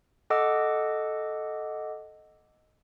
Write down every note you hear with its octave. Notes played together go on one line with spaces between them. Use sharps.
A4 D#5 F#5 D6 E6